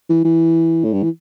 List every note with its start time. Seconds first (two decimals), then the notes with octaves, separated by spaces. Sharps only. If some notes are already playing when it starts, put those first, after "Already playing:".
0.09 E3
0.24 E3
0.84 A2
0.93 G2
1.03 E3